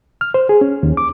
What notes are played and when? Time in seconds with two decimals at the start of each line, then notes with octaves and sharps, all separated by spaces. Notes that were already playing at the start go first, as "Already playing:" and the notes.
0.21 F6
0.34 C5
0.49 G#4
0.61 C#4
0.83 D#2
0.97 D6